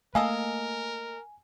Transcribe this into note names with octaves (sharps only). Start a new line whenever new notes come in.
A3 A#3 A4 A#4 D#5 F5 G#5